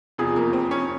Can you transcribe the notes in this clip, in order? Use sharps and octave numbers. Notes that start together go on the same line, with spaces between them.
F1 E2 C3 F3 G#4
A#3
C4
C#4